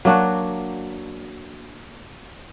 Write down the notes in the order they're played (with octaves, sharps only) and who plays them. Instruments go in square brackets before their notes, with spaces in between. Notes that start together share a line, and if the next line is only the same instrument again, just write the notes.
[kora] F#3 A#3 D4 F#4